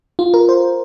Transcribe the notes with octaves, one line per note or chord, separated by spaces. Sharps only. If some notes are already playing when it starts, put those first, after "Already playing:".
F4
A#4
C5